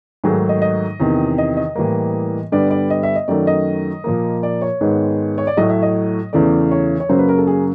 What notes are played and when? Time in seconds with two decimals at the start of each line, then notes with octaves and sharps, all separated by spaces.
0.24 G#2 D#3 F#3 A3 G#4
0.49 D#5
0.62 D#5
1.00 E2 C3 D#3
1.38 D#5
1.57 D#5
1.76 A2 E3 G3 A#3
2.52 G2 D3 G3 B3 D5
2.71 D5
2.90 D#5
3.03 E5
3.16 D#5
3.28 F#2 D#3 F#3 A3 D5
3.47 D#5
4.04 A#2 F3 A#3
4.43 D5
4.62 C#5
4.81 G#2 D#3 G#3 B3
5.38 C#5
5.47 D5
5.57 A2 F#3 A3 D#5
5.69 E5
5.82 D#5
6.33 E2 C#3 E3 A3 D5
6.71 C#5
7.00 C#5
7.09 F#2 C#3 F#3 A#3 C5
7.19 B4
7.29 A#4
7.38 A4
7.47 G#4